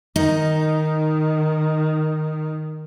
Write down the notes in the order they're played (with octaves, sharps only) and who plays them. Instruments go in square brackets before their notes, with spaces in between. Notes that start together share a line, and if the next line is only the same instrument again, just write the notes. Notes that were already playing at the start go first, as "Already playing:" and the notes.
[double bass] D#3 [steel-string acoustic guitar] D#4